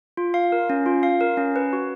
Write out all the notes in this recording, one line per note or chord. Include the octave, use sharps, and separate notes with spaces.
F4
F5
A#4
C#4
F4
F5
A#4
C#4
B4
F#4